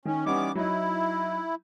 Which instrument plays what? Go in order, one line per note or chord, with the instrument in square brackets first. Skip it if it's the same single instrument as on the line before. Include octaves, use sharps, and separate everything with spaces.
[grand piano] D#3 [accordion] C#4
[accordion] E3 B3 D6 [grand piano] G3 C#4 D#4
[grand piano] F#3 D#4 [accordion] E4